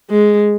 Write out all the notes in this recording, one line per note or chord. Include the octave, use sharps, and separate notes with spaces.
G#3